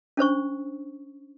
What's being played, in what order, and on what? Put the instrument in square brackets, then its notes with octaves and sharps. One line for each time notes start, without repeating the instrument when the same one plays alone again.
[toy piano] C#4 D4 C5 C#6